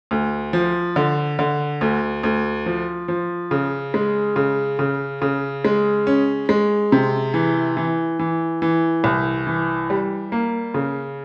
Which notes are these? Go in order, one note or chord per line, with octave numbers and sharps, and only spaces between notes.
D2
F3
D3
D3
D2
D2
F3
F3
C#3
G#3
C#3
C#3
C#3
G#3
C#4
G#3
C3
E3
E3
E3
E3
C2
E3
G3
A#3
C#3